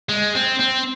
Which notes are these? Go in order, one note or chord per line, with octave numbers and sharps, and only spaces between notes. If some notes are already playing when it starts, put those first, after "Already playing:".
G#3
C4
C4